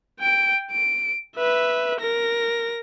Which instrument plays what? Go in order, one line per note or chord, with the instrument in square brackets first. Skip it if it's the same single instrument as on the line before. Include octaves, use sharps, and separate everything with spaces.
[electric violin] G5 D7
D7
B4 E5
A#4 A#6